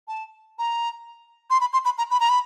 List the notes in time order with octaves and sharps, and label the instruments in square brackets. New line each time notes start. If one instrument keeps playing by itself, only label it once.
[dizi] A5
A#5
C6
B5
C6
B5
A#5
B5
A#5
B5